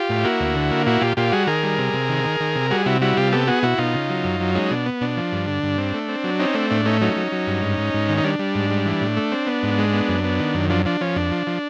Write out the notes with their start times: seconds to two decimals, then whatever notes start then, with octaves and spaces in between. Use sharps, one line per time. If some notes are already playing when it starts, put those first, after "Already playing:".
Already playing: F4 G4
0.10 A2
0.24 A#3 E4 F#4
0.40 D2
0.55 D3
0.71 A#3
0.86 A#2 E4 F#4
1.01 A#2 F4 G4
1.17 A#2 F4 G4
1.32 G3 F#4 G#4
1.47 D#3 G#4 A#4
1.63 G3
1.78 C3
1.93 C3
2.09 D#3
2.24 D#3
2.40 D#3
2.56 C3
2.71 G3 F#4 G#4
2.86 C3 E4 F#4
3.01 G3 E4 F#4
3.17 C3 F4 G4
3.32 B3 G4 A4
3.47 B3 F#4 G#4
3.63 B2 E4 F#4
3.78 B2 D#4 F4
3.94 C#3
4.09 F#3
4.24 F#2
4.40 F#3
4.55 G#3 C#4 D#4
4.71 B2 D4
4.86 B3
5.01 B2 D4
5.17 F3
5.32 G2
5.48 D3
5.63 G2
5.78 C4
5.94 A3
6.09 C4
6.24 F#3
6.39 C4 C#4 D#4
6.54 A3 D4
6.70 A2 D4
6.85 A3 C#4 D#4
7.01 F#3 C#4 D#4
7.17 F#3
7.32 F#3
7.47 G2
7.63 G#2
7.78 G#2
7.94 G#2
8.09 D#3
8.18 D#4
8.24 G3 D4
8.39 G3
8.55 G#2
8.70 G3
8.86 E3
9.01 A2
9.17 A3
9.32 C4
9.47 B3
9.63 G#2
9.78 G#3
9.93 B3
10.08 F#2
10.24 B3
10.40 D#3
10.54 F#2
10.70 F3 D4
10.86 F3 D4
11.01 F3 C#4
11.16 F2 D4
11.32 F3
11.47 F3